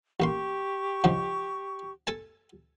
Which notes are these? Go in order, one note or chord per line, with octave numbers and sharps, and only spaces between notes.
A1 A#3 G4 C6 C#6
G#2 C#3 F3
A4 G#5 A5